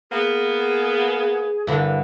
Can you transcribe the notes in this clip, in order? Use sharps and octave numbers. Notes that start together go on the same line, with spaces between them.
A#3 B3 G#4
G2 D3 E3 A#4